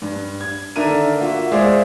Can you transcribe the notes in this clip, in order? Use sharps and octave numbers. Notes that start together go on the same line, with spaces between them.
G2
G#6
D3 D#3 D4 A#4 E5 D#7
A#3 F4 F#4 E5
G#3 G#4 C5 D5 E5 F5